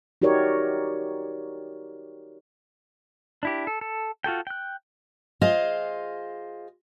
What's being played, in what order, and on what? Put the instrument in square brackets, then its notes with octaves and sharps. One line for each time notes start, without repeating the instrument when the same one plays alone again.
[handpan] D#4 F#4 G4 A#4 C#5 D5
[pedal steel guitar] D4 E4 G4
A4
A4
F4 F#4 A4 G5
G5 F#6
[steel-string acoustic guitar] F4 G#4 C5 D#5 F5